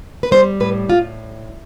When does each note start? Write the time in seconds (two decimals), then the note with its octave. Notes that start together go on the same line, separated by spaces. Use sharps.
0.23 B4
0.31 G3 C5
0.60 A2 B4
0.89 A2 F4